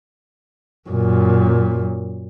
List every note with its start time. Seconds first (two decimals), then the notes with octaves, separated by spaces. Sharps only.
0.89 F#2 A#2